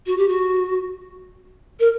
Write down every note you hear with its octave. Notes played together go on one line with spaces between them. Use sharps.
F#4
G4
F#4
A#4